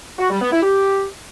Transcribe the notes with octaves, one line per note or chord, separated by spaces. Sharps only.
F#4
G3
B3
E4
G4